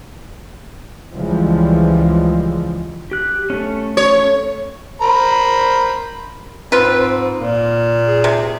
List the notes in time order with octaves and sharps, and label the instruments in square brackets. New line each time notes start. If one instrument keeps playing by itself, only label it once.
[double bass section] C#2 C#3 E3 F3 G3 G#3
[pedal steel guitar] G4 F#6
A3 C#4
[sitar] C#5
[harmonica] A#4 C5 B5
[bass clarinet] G#2 [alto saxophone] C4 [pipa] F4 B4
[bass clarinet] A#2 [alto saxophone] A#3
[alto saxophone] G#4
[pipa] C3